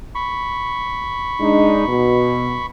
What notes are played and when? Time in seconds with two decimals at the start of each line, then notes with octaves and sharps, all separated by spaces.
0.15 B5 C#6
1.40 G#3 D4 D#4
1.87 B2